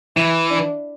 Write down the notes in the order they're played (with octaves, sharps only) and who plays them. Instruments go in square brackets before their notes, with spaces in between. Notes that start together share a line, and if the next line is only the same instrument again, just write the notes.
[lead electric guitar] E3 [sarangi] E4
[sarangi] D4